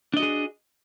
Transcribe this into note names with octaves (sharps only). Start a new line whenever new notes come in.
D4 F#4 G#4 D#5